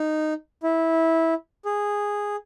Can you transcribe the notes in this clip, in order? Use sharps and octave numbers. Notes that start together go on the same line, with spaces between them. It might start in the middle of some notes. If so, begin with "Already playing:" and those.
Already playing: D#4
E4
G#4